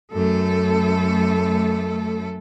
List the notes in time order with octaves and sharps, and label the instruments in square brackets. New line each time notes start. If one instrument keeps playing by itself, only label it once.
[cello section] F#2 A3 A4